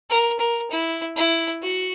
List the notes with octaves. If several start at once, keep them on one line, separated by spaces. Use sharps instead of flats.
A#4
A#4
E4
E4
F#4